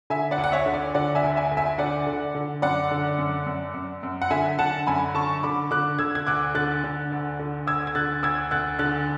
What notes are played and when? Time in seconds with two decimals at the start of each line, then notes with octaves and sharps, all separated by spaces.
0.10 D3 E5 G#5
0.31 D5 F#5
0.38 D2
0.44 F#5
0.52 C#5 E5
0.66 D3
0.73 D5
0.94 D3 D5 F#5
1.15 E5 G#5
1.23 D2
1.36 E5 G#5
1.51 D2
1.57 E5 G#5
1.78 D3 D5 F#5
2.07 D3
2.35 D3
2.62 F#2 D5 F#5
2.91 D3
3.18 F#2
3.47 F#2
3.74 F#2
4.03 F#2
4.22 F#5
4.31 D3 E5 G#5
4.58 D3 F#5 A5
4.87 F#2 G#5 B5
5.15 D3 A5 C#6
5.43 D3 B5 D6
5.71 D3 D6 F#6
5.99 D3 E6 G#6
6.15 G#6
6.27 D2 D6 F#6
6.55 D3 F#6 A6
6.84 D3
7.12 D2
7.39 D3
7.67 D2 E6 G#6
7.87 G#6
7.95 D3 F#6 A6
8.23 D2 E6 G#6
8.51 D2 F#6 A6
8.79 D3 F#6 A6